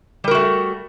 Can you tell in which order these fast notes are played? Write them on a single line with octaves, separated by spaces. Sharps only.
G3 A#4 F#4 A3